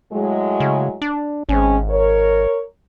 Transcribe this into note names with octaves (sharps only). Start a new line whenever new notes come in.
A2 F#3 G#3
C#3
D4
G#1 G#3 C4 C#4
A#4 C#5